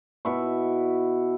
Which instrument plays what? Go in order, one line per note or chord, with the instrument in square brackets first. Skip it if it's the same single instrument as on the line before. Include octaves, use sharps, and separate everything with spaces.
[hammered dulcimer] B2 E4 C#6